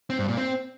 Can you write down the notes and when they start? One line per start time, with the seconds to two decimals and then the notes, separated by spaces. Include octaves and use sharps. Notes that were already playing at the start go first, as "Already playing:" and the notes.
0.10 C4
0.19 G2
0.28 A#2
0.37 C4